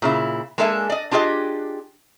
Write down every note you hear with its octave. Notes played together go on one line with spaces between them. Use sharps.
A#2 C#3 E4
G#3 A#3 D4 A4 E5 G#5
D5 D#5
D4 F4 G4 G#4 D#5